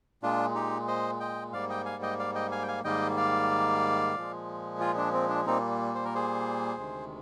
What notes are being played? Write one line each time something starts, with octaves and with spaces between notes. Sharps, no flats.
A#2 G#3 D4 F4
D#4 G4
C5 D#5
D#5 G5
G#2 G3 A#3 D5 F5
D#5 G5
F5 G#5
D#5 G5
D5 F5
D#5 G5
F5 G#5
G5
F5 G#5
G#2 D#3 G3 A#3 D#5 G5
D5 F5
A#2 F3 G#3
F4 G#4
D4
C4
D4
A#2 G3 A#3 C4 D#4
C5
A#4
G#4 C5
D2 C3 D#3 G#3